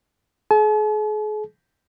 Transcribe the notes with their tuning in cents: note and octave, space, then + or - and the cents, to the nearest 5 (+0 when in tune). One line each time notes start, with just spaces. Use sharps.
G#4 +40 A5 -45